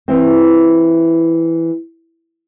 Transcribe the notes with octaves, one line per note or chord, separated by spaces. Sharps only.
E3 C4